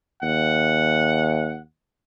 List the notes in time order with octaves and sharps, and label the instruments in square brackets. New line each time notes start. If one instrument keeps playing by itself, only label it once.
[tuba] D#2 [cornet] F#5